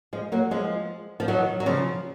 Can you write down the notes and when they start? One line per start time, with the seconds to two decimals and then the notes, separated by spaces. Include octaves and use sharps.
0.13 F3 G#3
0.32 F#3 A#3
0.51 F3 G#3
1.20 F3
1.28 D#3 F#3
1.60 F#3
1.66 C#3 F3